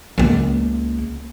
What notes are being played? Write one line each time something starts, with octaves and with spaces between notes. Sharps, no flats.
C#2 A#3